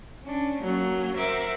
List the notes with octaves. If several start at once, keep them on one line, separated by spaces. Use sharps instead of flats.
C#4 D4
F#3 A#3 C#4
A#4 C5 E5 F#5 D6